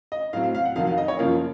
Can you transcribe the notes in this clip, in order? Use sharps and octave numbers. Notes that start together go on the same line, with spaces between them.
D#5
A2 F#3 C4 F5
F5
F5
F#5
F2 D#3 F#3 F5
F5
D#5
C#5
F#2 C#3 F3 A#3 F5